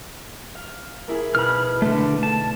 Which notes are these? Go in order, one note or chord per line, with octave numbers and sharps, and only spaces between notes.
F5
A#3 E4 G#4
B2 D#4 B5 F6
D3 A3
A5